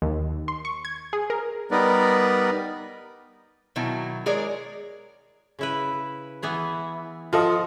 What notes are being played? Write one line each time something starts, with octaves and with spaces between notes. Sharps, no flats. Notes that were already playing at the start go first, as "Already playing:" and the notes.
D#2
C6
C#6
G#6
G#4
A#4
G3 B3 D#4 A#4 B4 D5
B2 D#3 F#3 E4
G#3 G#4 A#4 C#5 D5
C#3 E4 B4
E3 B3 G#4
F3 F4 A4 D#5